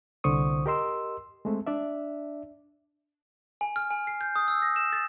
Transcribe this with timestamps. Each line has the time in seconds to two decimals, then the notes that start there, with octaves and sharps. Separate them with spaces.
0.24 C2 D3 C5 C#6 D#6
0.66 G4 A#4 D#5 C6 E6
1.45 G#3 A3 C4
1.67 D4 D5 E5
3.61 G#5
3.76 F6
3.91 G#5
4.07 C7
4.21 G6
4.36 D#6
4.48 E6
4.62 A#6
4.76 E7
4.93 A6